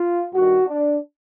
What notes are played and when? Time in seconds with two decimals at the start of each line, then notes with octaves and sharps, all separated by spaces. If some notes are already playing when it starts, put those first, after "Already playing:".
Already playing: F4
0.34 G2 D#3 G3 F#4
0.67 D4